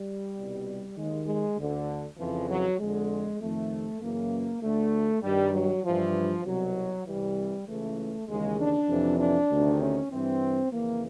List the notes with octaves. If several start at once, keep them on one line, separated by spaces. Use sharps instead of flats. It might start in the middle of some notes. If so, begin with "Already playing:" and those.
Already playing: G3
C2 B2
D#2 D#3 G#3
G#3
D2 D3
F2 C#3 E3 F3
F#3
F2 D3 G#3
F2 C3 D#3 A3
F#2 C#3 E3 A#3
D2 D3 A3
G2 D#3 G3
F#3
G2 E3 F3
C2 B2 F#3
C2 C3 E3 G3
C#2 C#3 E3 A3
D#2 C#3 E3 G#3
D4
F2 C3 E3
D4
D2 C3 D#3
C#4
G2 E3 C4
F2 C#3 E3 A#3